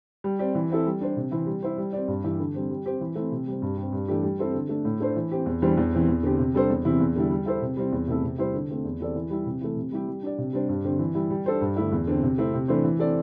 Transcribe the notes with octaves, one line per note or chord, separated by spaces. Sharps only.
G3
C4 G4 D5
E3
C4 E4 A4
G3
D4 C5
C3
E3 C4 E4
G3
E4 C5
G3
C4 G4 D5
G2
E3 G3 E4 G4
D3
G3 C4
G3
C4 G4 C5
E3
A3 C4 E4
C3
G3 C4
G2
G3 C4
G2
E3 A3 D4 G4
G3
C4 E4 A4 C5
D3
A3 D4
A2
A3 D4 C5
E3
C4 G4
E2
E3 G3 D4 C5
E2
E3 C4
E2
D3 C4 G4
C3
G3 D4 A4 C5
E2
C3 E3 C4 E4
E2
D3 G3 E4
G3
E4 A4 C5
C3
G3 C4 E4
E2
C3 A3 E4 A4
C3
G3 E4 C5
D3
A3 C4
E2
E3 C4 A4 D5
E3
G3 E4
C3
E3 A3
C3
G3 E4 G4
G3
D4 G4 D5
C3
G3 D4 C5
G2
D3 C4 G4
E3
G3 E4
G3
D4 A4 C5
G2
D3 A3 E4
E2
D3 C4
C3
A3 C4 E4
C3
E3 A3 D4 C5
E3
C4 A4 D5